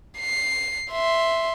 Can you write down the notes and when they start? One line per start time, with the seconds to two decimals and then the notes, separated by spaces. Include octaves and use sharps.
0.18 C7
0.92 E5 C6